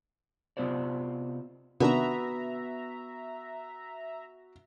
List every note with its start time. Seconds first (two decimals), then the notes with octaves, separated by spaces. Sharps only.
0.57 C3 B3 F4 C5 D5
1.80 C3 D#3 B3 D4 F#4 E5 A#5